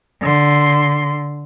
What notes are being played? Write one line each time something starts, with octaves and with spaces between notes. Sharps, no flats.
D3 C6